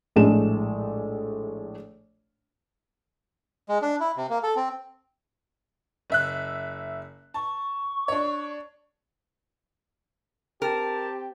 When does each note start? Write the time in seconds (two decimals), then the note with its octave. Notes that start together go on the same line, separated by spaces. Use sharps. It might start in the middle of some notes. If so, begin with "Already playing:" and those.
0.16 A#1 A2 G#3 A3 E7
3.69 G#3
3.82 D4
4.00 E4
4.17 C3
4.30 A#3
4.43 A4
4.56 C4
6.10 F#1 E5 F#6
7.34 A5 C#6
8.08 D4 C#5
10.62 C4 G4 A#4 A5